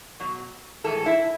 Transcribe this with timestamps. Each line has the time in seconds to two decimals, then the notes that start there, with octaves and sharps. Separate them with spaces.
0.20 B2 F#3
0.84 A2 E3 G#3 A4
1.06 E4